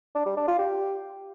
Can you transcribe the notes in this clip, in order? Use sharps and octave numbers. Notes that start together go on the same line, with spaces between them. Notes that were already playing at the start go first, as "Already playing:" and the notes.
D4
G3
D4
F4
G4